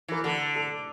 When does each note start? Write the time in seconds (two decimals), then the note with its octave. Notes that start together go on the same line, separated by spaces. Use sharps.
0.08 E3 A#4
0.24 D3 A4
0.56 A4